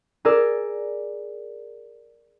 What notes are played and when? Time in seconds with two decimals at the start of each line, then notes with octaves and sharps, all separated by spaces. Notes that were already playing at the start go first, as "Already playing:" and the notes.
0.25 G#4 A#4 D5 E6